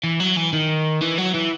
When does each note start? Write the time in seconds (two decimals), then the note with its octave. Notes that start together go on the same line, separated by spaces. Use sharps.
0.03 E3
0.20 F#3
0.36 E3
0.53 D#3
1.02 E3
1.18 F#3
1.34 E3